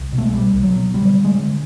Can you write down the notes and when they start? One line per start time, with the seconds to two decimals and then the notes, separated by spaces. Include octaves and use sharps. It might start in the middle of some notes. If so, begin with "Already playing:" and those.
Already playing: C2
0.12 B2
0.18 A3
0.25 G#3
0.33 C2 G3
0.54 C2
0.63 F#3
0.74 B2
0.94 D3 G3
1.14 D3
1.25 G#3
1.35 D3